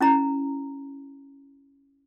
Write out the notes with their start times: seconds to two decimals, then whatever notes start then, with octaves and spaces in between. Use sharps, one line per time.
0.01 C#4 E4 A#5